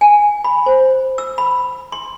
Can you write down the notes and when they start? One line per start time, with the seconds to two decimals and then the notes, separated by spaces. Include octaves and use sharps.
0.01 G#5
0.44 B5
0.66 C5
1.18 E6
1.38 B5
1.92 C6